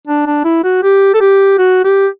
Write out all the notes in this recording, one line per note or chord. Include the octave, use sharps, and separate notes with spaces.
D4
D4
E4
F#4
G4
A4
G4
F#4
G4